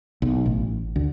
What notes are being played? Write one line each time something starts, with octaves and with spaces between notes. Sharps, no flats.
B1
A1
D2